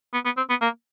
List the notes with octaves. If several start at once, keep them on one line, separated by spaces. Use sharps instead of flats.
B3
B3
C4
B3
A#3